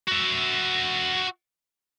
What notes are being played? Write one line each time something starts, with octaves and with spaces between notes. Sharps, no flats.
F#4 E5